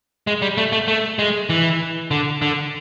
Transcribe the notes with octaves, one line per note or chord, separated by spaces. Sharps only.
G#3
G3
A3
A3
A3
G#3
E3
D3
D3